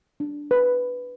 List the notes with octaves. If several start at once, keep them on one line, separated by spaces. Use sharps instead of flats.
D4
B4